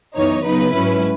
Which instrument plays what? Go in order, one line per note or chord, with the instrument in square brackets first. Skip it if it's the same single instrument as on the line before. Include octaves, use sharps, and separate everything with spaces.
[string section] F#2 E3 B3 D#4 C#5
C#3 F#3 B3 D#4 B4
G#2 F#3 C#4 E4